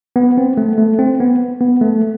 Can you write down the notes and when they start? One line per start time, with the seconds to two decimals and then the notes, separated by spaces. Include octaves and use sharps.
0.16 B3
0.38 C4
0.57 A3
0.78 A3
0.99 C4
1.20 B3
1.61 B3
1.81 A3